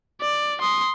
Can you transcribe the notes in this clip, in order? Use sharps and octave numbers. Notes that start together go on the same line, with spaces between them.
D5
C6 D#6